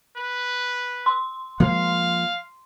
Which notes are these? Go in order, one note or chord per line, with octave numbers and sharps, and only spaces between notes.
B4
C6
F3 G#3 A#3 F5